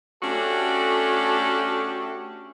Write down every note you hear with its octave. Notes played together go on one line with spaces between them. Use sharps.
A3 C#4 D4 F#4 G4 A4